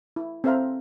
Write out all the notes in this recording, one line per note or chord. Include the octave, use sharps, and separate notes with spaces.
E4
C4 A4 C5 E5 F5 A#5